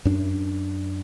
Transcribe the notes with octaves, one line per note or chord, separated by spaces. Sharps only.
F#2 D4